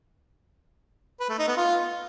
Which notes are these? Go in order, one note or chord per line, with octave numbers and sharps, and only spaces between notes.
B4
A3
D#4
B3
F4